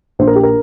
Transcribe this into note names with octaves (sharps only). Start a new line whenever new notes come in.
A#1 C5
A#4
G4
A#4